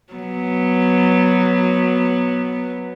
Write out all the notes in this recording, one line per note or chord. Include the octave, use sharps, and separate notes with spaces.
F#3 B3